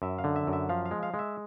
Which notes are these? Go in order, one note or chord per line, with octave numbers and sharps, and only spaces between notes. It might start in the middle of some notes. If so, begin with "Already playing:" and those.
F#2 E5
F5
D3
E5
F#2
E5
F3 F5
F5
G#3
F5
G#3
E5